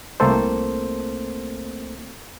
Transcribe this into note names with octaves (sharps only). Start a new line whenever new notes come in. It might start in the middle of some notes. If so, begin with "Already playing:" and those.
C2 A3 A#3 C4 A4 C5